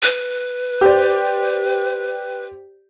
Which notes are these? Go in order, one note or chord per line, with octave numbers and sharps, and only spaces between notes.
B4
G4 C5 D5